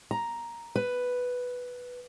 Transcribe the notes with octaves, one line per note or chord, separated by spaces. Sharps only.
A#5
B4